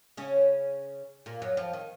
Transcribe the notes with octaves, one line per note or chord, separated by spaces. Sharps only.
C#3 C#4
A#2 A#3
F#2 F#3
F2 F3
D#3